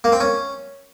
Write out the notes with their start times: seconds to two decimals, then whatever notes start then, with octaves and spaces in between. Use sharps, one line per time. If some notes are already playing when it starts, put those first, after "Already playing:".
0.04 A#3
0.12 C4
0.20 C#4